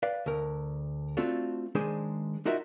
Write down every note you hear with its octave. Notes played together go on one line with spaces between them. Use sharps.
B4 D5 F5
D2 A#4
A3 C4 D4 F4 F#4 A4
D#3 G#3 D4 G#4 C5
D#4 F4 F#4 A#4 D#5 E5